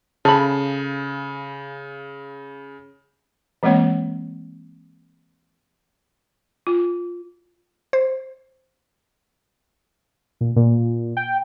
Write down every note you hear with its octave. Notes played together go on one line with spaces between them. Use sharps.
C#3 A4 B5
E3 G#3 A#3 C4 C#5
F4
C5
A#2
A#2
G5